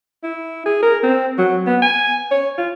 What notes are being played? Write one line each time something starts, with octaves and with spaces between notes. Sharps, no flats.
E4
G#4
A#4
C4
F#3
B3
G#5
C#5
F4